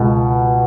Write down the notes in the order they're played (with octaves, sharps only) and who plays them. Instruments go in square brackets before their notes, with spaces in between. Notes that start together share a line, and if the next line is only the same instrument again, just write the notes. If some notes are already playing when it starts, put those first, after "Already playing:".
Already playing: [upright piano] C#2 B2